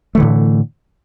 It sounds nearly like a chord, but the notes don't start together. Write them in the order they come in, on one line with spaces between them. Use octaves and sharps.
A3 E3 D3 A2